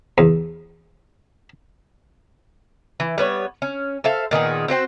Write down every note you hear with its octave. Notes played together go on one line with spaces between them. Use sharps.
E2
E3
G3 B3 C#5
C#4
A4 C5 E5 F5
A#2 D#3 B3 G#4
C4 F#4 C5 G5